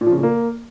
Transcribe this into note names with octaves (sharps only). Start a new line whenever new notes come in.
A#2
F3
C#3
A#2
A#3